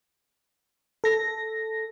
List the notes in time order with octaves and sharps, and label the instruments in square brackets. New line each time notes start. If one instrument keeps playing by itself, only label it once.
[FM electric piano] A4 A#6